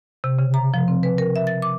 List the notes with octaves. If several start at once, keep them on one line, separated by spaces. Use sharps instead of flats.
C3
C#3
A#5
F3
C4
B4
A#4
E5
A6
D6